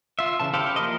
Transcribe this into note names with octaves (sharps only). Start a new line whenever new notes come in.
F4 E5
C#3 E3 A5
E4 G4 A4 C5 F5
F3 A#3 E4 A#4 D#5